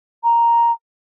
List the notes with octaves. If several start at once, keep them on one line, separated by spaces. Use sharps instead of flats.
A#5